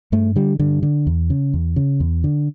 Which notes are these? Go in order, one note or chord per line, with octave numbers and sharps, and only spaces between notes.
G2 A3
D3 G3
G2 D3
D3
E2
C#3
E2
C#3
E2
D3